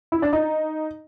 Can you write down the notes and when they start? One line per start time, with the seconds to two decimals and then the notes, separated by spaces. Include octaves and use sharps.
0.12 E4
0.22 D4
0.33 D#4